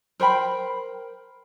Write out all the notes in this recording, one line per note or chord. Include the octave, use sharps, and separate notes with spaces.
A#4 C5 G5 B5